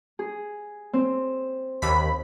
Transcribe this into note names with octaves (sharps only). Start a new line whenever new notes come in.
G#4
C4
D#2 B5